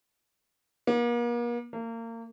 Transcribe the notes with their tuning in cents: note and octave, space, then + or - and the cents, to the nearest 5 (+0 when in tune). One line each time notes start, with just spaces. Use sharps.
A#3 +40
A#3 -30